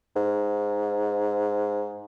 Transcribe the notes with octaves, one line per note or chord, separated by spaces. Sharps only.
G#2